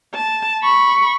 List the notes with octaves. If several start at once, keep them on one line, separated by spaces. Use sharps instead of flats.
A5
B5 C#6